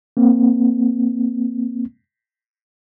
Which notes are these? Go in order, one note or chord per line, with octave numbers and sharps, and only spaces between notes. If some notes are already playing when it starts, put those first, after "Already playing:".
A#3 C4